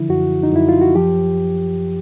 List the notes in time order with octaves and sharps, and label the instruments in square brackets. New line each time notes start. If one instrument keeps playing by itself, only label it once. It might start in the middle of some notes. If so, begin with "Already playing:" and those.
Already playing: [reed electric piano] D3 F3 E4
F#2 F#4
D#4
F#2 E4
F4
F#4
F3 G4